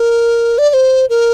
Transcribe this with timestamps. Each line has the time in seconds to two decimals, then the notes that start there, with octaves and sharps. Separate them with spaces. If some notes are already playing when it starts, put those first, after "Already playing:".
Already playing: A#4
0.58 D5
0.70 D5
0.73 C5
1.09 A#4